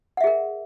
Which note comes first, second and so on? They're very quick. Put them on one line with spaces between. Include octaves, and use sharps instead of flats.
F#5 E5 G#4 A#4